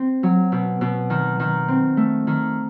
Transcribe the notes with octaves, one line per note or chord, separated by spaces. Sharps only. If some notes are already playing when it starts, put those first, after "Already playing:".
Already playing: C4
F#3
B2
B2
D#3
D#3
C4
A3
D#3